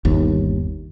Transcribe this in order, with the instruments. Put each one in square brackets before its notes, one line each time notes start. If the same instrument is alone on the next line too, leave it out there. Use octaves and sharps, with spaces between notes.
[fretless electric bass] G1 D#2